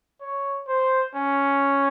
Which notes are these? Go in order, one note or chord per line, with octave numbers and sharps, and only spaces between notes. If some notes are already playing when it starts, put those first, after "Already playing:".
C#5
C5
C#4